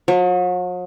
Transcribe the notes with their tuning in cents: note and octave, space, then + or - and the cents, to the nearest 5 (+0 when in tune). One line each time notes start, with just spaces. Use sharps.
F#3 -45 C#6 +0